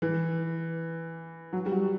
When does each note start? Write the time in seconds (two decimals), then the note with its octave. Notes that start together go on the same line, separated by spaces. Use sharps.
0.02 E3
1.53 F#3
1.66 G3
1.72 F#3